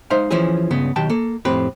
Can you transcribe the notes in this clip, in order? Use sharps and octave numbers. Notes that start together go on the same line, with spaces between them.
G#3 D#4 C5 E5 F5
E3 F3 C#4 E4 G#4
C#2 G2 C#3 B3
B1 D#3 G4 G5 A5
A#3 A4
F2 A2 C4 G4 B4